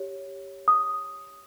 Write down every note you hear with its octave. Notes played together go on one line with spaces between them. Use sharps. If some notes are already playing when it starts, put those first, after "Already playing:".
Already playing: G4 C#5
D#6